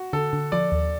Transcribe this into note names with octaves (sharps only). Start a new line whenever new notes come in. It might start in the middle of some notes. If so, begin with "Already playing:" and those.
Already playing: F#4
D3 A4
D3
F3 D5
D#2